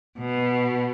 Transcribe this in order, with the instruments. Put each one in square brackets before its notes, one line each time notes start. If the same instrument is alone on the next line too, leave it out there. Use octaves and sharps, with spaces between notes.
[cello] B2